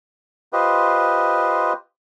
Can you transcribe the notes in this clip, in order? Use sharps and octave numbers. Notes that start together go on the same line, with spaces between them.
F4 G4 B4 C5 D#5